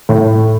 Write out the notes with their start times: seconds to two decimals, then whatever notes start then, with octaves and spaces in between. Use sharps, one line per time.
0.09 A2